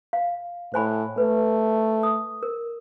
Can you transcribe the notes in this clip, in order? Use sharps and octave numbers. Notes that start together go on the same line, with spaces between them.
F5
A2 C5 G#5 B5
A3 B4
D#6
A#4